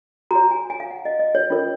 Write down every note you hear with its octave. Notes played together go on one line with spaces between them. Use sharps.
F#4 C#5 A#5
G#5
G#5
F5
F#5
D#5
D#5
C#5
C#4 F4 A#4 C#5